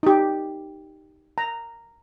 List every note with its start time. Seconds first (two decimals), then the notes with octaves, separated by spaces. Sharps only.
0.03 D#4 G4
1.38 A#5